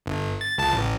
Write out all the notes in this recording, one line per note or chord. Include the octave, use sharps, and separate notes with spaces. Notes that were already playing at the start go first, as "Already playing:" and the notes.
G1
A6
C#2 A5 A6
A1